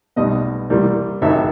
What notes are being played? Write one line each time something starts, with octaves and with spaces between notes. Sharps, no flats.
B1 B2 G3 B3 D#5
C2 C3 E3 G3 A#3
G#1 F#2 C#3 F#3 E5